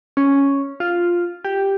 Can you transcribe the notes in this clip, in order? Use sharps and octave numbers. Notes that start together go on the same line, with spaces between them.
C#4
F4
G4